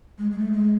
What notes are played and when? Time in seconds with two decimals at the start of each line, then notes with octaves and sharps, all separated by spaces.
0.18 G#3
0.31 G#3
0.38 A3
0.52 G#3